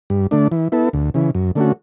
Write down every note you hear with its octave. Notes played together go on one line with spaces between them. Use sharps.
G2
D3 A3 D4
E3
B3 E4 A4
D2
C#3 E3
F#2
D3 A3 C#4 F#4